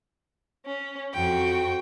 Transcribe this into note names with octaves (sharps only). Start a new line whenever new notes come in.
C#4
F2 F#4 G5